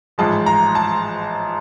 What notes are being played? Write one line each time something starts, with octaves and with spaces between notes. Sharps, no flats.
A1 G#2 F3 G#3 A5
A#5
A5